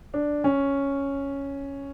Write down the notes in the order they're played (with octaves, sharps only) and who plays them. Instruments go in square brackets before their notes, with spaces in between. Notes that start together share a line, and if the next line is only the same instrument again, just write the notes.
[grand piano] D4
C#4